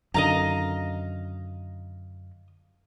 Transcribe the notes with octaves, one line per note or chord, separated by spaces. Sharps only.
F#2 D3 D#3 D#5 F5 A#5